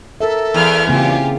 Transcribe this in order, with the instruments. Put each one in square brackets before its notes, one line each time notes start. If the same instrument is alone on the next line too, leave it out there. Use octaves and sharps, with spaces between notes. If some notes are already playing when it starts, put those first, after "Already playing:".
[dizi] A4 [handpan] A#4 E5
[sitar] E2 [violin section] F5 B5 F6
[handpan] C#3 A#3 C4 [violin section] F4 G4 [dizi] G#5